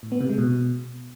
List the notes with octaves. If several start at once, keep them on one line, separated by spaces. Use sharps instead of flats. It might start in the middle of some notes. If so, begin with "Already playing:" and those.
A2
B3
C3
G#3
B2